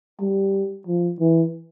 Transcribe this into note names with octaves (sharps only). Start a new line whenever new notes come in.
G3
F3
E3